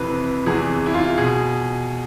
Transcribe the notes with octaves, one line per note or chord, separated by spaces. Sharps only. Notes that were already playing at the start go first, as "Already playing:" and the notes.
Already playing: F2 C3 E3 B4
E2 C3 E3 G#4
E4
F4
B2 G#4